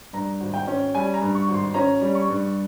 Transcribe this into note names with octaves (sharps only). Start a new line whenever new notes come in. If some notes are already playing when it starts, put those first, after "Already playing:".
G2 A#5
G#1
G5
C#4
G3 G#5
A#5
G2
C#6
G#1
C6
C#4 A#5
G3
C#6
G2